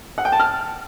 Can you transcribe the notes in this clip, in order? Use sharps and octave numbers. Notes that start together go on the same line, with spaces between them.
F#5
G5
A5
F6